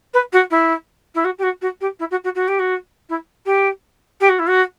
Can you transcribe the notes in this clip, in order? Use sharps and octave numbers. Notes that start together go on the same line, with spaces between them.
B4
F#4
E4
E4
F#4
G4
F#4
F#4
G4
E4
F#4
F#4
F#4
G4
F#4
E4
G4
G4
F#4
E4
F#4